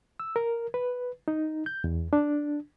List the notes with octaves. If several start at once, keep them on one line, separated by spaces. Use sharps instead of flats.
E6
A#4
B4
D#4
G6
E2
D4